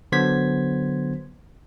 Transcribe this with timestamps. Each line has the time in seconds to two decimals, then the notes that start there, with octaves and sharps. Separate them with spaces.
0.12 D3 F#3 B3 C5 G#6 B6